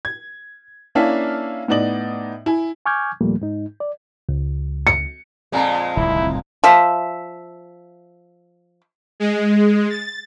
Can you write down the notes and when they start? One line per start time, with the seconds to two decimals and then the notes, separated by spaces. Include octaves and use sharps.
0.05 G#6
0.95 A#3 C#4 D4 E4 E5 F5
1.68 A2 B3 D#4 D5 F#7
2.46 E4 G#5
2.86 G#5 C#6 D6 F6 G6 G#6
3.21 D#2 A#2 F3 G3 A3 A#3
3.41 G#2 D#4
3.80 D5
4.29 C#2
4.87 C#7
5.52 F2 A#2 G#3 D5 G#5 A#5
5.97 D1 C2 D#3 E4
6.64 F3 E5
9.20 G#3
9.90 A6